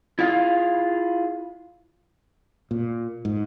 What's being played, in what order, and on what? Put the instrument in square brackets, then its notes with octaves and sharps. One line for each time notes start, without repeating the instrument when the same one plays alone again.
[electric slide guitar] E4 F4 G#4 F5
[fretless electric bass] A#2
G#2